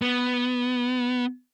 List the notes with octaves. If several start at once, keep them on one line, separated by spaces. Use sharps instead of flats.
B3